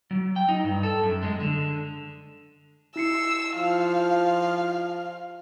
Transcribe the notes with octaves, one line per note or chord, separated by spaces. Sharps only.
F#3
G5
D#4
G2
A4
F#2
G#3
D3
E4 E6 C7 C#7
F3 F5